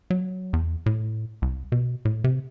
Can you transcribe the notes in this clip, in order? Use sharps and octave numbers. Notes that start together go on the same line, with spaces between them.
F#3
E2
A2
C2
B2
A2
C3